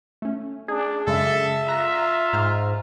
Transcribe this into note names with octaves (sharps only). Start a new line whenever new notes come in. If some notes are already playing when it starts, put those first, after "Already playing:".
A3 C#4
D4 G#4
F#2 C#3 G#3 A4 E5
F4 A#5 F#6 A#6
G#2 A#5 F6